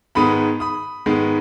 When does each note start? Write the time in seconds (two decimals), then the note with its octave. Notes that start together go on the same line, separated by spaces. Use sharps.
0.15 G#2 D#3 G#3 B3 B5 D#6
0.60 B5 D#6
1.06 G#2 D#3 G#3 B3